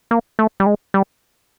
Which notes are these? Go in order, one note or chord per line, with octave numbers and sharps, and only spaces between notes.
A#3
A3
G3
G#3
G3